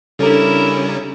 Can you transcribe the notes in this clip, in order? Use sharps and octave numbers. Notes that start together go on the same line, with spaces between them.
C#3 G3 C#4 D4 E4 A4 A#4